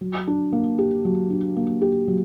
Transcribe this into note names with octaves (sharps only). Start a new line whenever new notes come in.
F#3
D4
A#3
G4
F#3
D4
A#3
G4
F#3